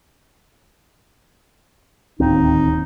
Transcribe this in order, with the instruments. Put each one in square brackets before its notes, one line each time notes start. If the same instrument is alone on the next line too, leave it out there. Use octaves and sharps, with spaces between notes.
[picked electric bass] D1 D#2 C4 [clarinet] D#4